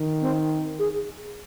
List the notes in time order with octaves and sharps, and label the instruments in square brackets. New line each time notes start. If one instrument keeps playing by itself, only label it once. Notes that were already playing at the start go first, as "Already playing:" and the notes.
Already playing: [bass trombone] D#3
[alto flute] C4
G#4